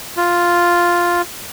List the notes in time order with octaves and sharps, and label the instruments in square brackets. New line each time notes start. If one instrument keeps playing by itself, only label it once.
[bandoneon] F4